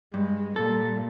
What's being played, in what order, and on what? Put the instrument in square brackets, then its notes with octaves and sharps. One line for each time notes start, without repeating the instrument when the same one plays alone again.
[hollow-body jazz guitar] G2 [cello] G#3
[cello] A#2 G3 [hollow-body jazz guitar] A4